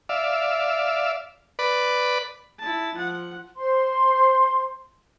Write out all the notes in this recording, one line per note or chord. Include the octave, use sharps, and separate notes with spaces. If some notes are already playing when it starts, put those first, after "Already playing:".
D5 E5 F5
B4 D5
E4 A5
F3 F#5
C5 C6